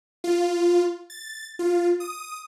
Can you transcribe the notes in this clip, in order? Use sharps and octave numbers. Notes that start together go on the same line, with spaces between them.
F4
A6
F4
D#6